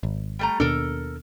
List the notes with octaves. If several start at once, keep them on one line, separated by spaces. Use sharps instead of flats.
G#1
G3 A3 A#5
D#2 B2 D4 A4 A#4